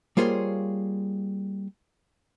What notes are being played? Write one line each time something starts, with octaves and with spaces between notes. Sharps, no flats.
G3 A#3 F4 G#4 C5 C#5